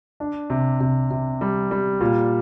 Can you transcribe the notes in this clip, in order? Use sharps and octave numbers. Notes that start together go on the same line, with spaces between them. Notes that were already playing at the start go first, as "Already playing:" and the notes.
D4
C3
C3
C3
G3
G3
A#2